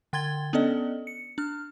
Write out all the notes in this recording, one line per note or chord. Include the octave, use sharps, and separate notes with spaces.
D3 G5 C6 G#6 A6 G7
B3 C#4 D4 A4 D5 D#5
C#7
D4 F6